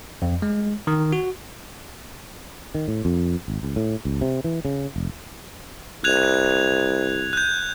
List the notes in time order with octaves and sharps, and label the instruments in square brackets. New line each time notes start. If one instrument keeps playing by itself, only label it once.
[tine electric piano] F2
G#3
D#3
F#4
[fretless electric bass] D#3
A2
F2
G#1
C#2
A2
C#2
C3
E3
C#3
F1
[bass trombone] C2 [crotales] F#6 G#6 F7
[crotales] F#6 G6